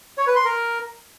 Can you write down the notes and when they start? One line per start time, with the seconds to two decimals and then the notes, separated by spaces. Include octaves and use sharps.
0.18 C#5
0.27 B4
0.36 C6
0.45 A#4